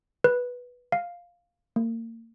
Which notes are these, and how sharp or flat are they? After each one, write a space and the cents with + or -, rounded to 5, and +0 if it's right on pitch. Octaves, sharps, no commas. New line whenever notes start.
B4 -5
F5 +5
A#3 -35